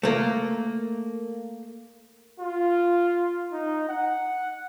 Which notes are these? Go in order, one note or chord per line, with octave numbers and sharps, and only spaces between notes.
A3 A#3
F4
D#4
F#5